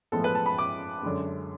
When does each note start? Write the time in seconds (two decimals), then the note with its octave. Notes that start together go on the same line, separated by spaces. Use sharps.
0.12 A2 F3 G#3 B3 A4
0.24 B4
0.35 A5
0.46 B5
0.58 D6
1.03 F#2 D3 G#3